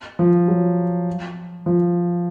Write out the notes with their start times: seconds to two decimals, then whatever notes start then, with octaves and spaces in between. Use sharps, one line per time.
0.19 F3
0.48 F#3
1.66 F3